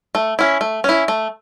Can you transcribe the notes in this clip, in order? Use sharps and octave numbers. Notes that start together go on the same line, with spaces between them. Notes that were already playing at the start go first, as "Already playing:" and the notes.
A3
C#4 E4
A3
C#4 E4
A3